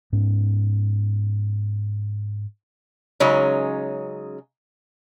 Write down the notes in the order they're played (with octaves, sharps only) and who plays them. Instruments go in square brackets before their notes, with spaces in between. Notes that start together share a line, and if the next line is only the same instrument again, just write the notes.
[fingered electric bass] G#2 B3 C#4
[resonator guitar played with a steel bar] C#3 F#3 G#3 C#4 D#4